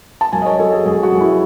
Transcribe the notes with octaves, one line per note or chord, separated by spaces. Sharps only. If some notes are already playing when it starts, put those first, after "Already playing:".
A5
F#2 G#5
D#5
C#5
F#3 A4
G#4
F#2 G#4
F#4
F#2
E4